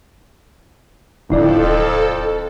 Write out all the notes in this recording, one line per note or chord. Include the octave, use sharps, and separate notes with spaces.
D1 F2 D3 E4 A4 D5